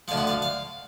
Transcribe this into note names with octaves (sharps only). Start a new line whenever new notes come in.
D2 D3 F3 F5
F#5
F5
F5